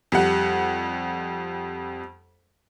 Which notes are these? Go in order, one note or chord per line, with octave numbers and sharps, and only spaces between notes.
F2 G3 F#5